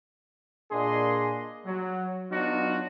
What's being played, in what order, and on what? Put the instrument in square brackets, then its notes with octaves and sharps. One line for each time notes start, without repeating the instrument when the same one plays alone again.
[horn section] A#2 A#3 D4 G#4 D#5 C6
F#3
F#3 B3 D4 D#4 F4 F#4